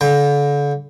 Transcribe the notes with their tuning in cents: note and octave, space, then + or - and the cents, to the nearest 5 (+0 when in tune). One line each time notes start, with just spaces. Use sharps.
D3 -40 G5 +20